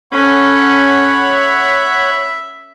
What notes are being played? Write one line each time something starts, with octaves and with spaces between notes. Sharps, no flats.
C#4 A4 C#5 F#5 B5
E5